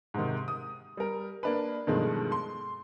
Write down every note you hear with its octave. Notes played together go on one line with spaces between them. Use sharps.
G#2 C3 D#3
D#6
G3 A#4
A#3 D4 B4
G2 B2 D#3 F3 G#3 A3
C6